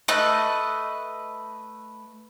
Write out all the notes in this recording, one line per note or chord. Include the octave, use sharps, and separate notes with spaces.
A3 B4 D#5 F#6